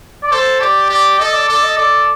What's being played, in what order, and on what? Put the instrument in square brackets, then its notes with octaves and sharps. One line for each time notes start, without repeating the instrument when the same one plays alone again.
[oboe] D5
[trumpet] A4 [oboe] C5
[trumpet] G4 [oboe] D5
[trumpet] G4 [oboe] D5
[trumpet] A4 [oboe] D#5
[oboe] D5
[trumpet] A4 [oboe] D5
[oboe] D#5
[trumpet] A4 [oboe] D5